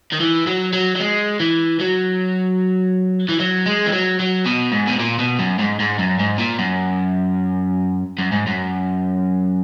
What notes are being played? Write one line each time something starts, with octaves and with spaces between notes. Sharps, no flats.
D#3
E3
F#3
F#3
F#3
G#3
E3
F#3
E3
F#3
G#3
E3
F#3
F#3
B2
G#2
B2
A#2
B2
F#2
G#2
G#2
F#2
G#2
A#2
F#2
F#2
G#2
F#2